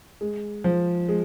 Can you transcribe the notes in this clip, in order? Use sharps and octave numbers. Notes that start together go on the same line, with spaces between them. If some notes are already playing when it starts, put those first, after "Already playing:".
G#3
F3
G#3